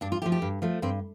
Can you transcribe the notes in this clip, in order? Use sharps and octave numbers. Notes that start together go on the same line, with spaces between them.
G2 D4
F4
F3 A3 G4
G4
G2
F3 A3
G2 C4